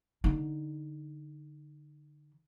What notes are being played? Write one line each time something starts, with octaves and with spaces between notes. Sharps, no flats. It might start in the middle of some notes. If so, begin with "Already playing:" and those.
D3 D#4